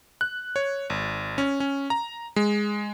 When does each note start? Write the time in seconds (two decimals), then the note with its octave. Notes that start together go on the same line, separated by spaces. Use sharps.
0.21 F#6
0.56 C#5
0.90 G#1
1.38 C#4
1.60 C#4
1.90 A#5
2.36 G#3